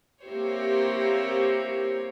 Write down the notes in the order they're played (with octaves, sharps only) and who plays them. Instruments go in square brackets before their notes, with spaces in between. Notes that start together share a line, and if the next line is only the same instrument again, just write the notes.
[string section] A#3 C4 E4 G4 C5 C#5